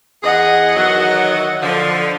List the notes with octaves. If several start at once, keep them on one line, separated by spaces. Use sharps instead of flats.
E2 G#4 D#5 F#5
D#3 E3 F#3
D3 F3